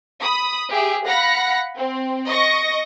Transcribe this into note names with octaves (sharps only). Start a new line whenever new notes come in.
B5 D#6
G4 G#4 E5
F5 F#5 B5 F#6 A#6 C#7
C4
D#5 C#6 A#6